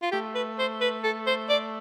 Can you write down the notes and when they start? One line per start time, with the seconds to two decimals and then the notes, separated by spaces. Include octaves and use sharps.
0.02 F4
0.12 A3 G4
0.35 B4
0.59 C5
0.81 B4
1.04 A4
1.27 C5
1.50 D5